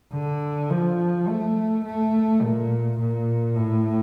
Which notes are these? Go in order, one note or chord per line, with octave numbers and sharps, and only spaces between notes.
D3
F3
A3
A3
A#2
A#2
A2